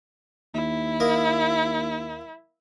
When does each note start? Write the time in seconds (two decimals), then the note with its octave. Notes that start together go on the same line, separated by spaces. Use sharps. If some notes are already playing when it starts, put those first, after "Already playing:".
0.54 D#2 E4
1.00 A#3 A#4 D#5